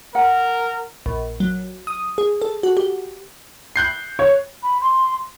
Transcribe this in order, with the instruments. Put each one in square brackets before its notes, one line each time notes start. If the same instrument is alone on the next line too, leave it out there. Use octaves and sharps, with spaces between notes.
[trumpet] A#4 [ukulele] F#5
[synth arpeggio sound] A#1
F#3
D#6
G#4
A4
F#4
G4
[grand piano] F#6 G6 C7
[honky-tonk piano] C#5
[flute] B5
C6